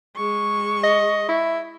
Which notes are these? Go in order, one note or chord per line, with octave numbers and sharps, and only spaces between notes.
G#3 C#6
D#5
E4